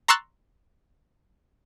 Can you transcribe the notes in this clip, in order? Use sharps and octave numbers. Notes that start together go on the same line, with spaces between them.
A#5 C6 C#6 E6 F#6 A6